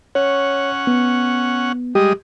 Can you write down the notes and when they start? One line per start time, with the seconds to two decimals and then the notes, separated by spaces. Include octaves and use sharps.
0.15 C#4 C#5 F#5
0.87 B3
1.95 G3 G#3 G4 D#5